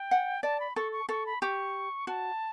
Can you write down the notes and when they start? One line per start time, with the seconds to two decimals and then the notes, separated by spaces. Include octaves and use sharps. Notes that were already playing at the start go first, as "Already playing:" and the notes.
Already playing: G5
0.11 F#5
0.43 D5 A5
0.60 B5
0.76 A4 C#6
0.92 C#6
1.09 A4 C#6
1.26 B5
1.42 G4 C#6
2.07 F#4 A5